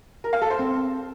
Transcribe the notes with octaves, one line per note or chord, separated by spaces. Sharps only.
A#4
F5
A4
C5
C4